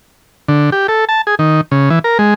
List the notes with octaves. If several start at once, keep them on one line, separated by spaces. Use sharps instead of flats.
D3
G4
A4
A5
G#4
D#3
C#3
E3
A#4
G#3